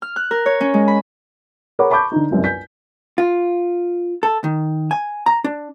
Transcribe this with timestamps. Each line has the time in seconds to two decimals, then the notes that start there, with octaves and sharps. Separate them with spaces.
0.02 F6
0.16 F#6
0.31 A#4
0.46 C#5
0.61 C#4
0.74 G#3
0.88 B5
1.79 G#4 A#4 C#5 F#5 B5 D6
1.91 A5 B5 C#6 D6 G6
2.12 D3 D#4
2.30 G1 C2 F#2
2.44 G#5 G6 B6
3.18 F4
4.23 A4
4.44 D#3
4.91 G#5
5.26 A#5
5.44 D4